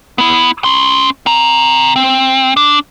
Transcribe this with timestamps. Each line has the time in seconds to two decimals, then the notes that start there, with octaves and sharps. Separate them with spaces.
0.18 B3 E4
0.64 C#4 C6
1.26 C4 A#5
1.96 C4
2.57 D4